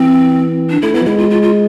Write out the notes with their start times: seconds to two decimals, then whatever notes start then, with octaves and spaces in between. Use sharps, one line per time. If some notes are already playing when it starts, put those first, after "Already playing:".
Already playing: E3 C4
0.70 D4
0.82 A3 E4
0.94 B3 E4
1.01 F3
1.06 G#3 E4
1.18 F4
1.31 F4
1.43 F4